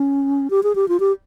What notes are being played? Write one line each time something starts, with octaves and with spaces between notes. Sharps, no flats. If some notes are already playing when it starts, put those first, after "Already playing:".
Already playing: C#4
G4
G#4
G4
F4
G4